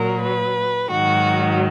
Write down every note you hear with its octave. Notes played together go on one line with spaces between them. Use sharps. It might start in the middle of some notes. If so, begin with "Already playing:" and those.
Already playing: A#2 F#3 A#4
B4
G#2 D#3 F#3 F#4